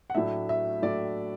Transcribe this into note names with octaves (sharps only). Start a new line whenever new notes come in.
F#5
A2 F#3 A3 D4 E5
E5
A2 F#3 A3 D4 D5